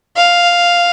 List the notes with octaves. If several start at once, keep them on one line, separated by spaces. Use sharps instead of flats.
F5